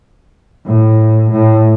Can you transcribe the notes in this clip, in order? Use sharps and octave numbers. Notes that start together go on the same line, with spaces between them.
A2
A2